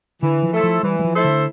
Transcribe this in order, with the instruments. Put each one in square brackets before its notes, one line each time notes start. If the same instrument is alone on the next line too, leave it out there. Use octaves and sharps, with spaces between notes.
[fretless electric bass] D3 [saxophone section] E3
[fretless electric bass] F3
[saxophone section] A3 E4 A4 C5
[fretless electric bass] F3
[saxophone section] E3 [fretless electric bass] G3
[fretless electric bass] G3
F3
[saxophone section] A3 E4 A4 C5
[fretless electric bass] D3